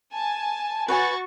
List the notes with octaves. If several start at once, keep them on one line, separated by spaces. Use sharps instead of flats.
G#5 A5
F#4 B4 C#5 G#5 C#6 A6